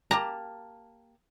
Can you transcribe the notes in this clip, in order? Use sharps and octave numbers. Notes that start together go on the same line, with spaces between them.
A#3 G4 A5 A#5